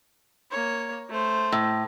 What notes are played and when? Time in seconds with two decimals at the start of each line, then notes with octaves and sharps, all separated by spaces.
0.51 A#3 C#5
1.09 A3 C5
1.52 A2